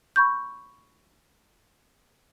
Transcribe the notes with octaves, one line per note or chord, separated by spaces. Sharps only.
B5 C#6 G6